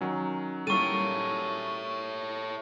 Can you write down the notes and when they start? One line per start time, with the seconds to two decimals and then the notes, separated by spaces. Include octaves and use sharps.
0.01 D#3 F#3 C#4
0.67 G3 A#3 E4 A4 C#5 C#6 D#7